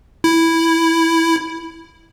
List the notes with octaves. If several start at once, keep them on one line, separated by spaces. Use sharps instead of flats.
E4